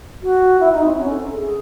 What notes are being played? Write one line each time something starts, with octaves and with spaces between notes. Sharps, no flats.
F#4
E4
D#4
C4
C#4
A4
G#4